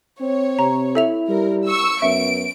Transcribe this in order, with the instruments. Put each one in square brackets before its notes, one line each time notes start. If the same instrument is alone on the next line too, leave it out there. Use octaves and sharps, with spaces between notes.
[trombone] C4 [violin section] C#5
[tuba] C3 [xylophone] A#5
[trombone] E4 [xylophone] A4 E5 F7
[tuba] G3 [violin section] A#4
[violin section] C#6 E6
[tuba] F#2 [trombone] B3 [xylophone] E5 [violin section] D7